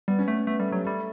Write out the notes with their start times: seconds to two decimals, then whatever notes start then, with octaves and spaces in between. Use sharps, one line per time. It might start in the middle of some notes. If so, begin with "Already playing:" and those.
0.08 G3 B3
0.19 C#4
0.28 A3 B3
0.47 A3 B3
0.59 G3 A3
0.72 F#3 G3
0.84 G3 A3